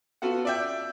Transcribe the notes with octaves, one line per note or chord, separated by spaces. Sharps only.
B3 F4 F#4 A4 F#5
D5 E5 G5